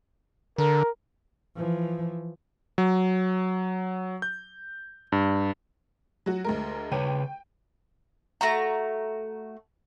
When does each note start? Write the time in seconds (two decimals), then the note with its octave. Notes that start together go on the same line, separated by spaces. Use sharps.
0.58 D3 A#4
1.55 E3 F3
2.78 F#3
4.22 G6
5.12 G2
6.26 F#3 F#4
6.45 D2 G#3 A#4
6.92 C#3 B4 C#5 G5 D#7
8.41 A3 F#4 A#5